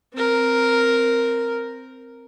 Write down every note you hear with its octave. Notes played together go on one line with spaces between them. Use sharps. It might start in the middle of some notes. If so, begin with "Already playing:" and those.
C4 A#4